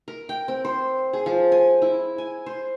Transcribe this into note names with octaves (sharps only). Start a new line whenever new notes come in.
A#4
G5
C4
C5
G#4
F3
G#5
E4
G#5
C5